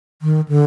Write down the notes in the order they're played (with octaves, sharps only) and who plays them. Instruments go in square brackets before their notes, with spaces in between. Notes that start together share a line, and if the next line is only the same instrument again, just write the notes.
[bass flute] D#3
D3